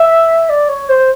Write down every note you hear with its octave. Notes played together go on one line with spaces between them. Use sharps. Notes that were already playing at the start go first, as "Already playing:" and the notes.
Already playing: E5
D5
C#5
C5